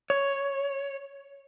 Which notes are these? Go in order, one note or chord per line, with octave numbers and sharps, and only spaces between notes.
C#5